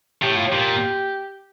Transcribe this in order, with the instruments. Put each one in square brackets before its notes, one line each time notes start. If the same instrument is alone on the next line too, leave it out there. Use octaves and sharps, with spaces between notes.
[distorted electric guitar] A2 [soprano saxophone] G4
[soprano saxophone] F4
[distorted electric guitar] A#2 [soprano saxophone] G4